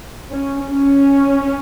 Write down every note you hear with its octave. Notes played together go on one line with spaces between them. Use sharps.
C#4
C#4